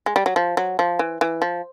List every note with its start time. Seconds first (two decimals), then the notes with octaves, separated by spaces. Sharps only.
0.06 G#3
0.16 G3
0.26 F#3
0.36 F3
0.57 F#3
0.79 F3
0.99 E3
1.21 E3
1.42 F3